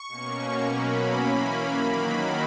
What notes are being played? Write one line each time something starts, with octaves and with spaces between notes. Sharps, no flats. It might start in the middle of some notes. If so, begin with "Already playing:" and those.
Already playing: C#6
B2 A#3 C#4
B2 F#3 A#3 C#4 B5
E3 A#3 C#4
D#3 F#3 A#3 B5